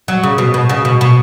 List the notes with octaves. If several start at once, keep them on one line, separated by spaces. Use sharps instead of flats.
F#3
C#3
B2
B2
C#3
B2
B2